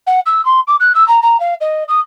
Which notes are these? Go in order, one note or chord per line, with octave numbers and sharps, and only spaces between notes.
F#5
E6
C6
D6
F#6
E6
A#5
A#5
F5
D#5
D#6